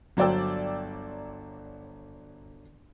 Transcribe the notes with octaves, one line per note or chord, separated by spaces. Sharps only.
G1 F#3 C5 D5 G5 E6